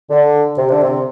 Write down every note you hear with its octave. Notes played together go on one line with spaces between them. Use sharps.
D3
C3
D3
C3